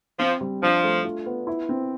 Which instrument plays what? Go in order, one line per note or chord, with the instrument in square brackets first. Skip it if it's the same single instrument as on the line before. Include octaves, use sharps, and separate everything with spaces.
[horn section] F3 [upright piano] C4
[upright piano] G3
[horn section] F3 [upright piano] D4
[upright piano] A3
F4
B3
E4
C4